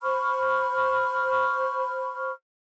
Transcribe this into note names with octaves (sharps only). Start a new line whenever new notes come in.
C5 B5 C#6 F6